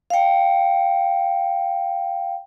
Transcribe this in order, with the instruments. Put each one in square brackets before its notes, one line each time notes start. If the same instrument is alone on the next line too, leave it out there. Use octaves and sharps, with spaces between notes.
[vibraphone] F5 G5